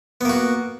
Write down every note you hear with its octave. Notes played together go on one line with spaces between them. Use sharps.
A#3 B3 F#4